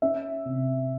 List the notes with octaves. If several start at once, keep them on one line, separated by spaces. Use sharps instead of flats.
C#4 E5
C3